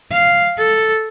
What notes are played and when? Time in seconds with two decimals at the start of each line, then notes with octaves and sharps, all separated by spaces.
0.12 F5
0.58 A4